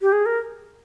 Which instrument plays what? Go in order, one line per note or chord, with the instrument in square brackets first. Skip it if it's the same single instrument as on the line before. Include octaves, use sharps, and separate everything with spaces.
[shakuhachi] G4
G#4
A#4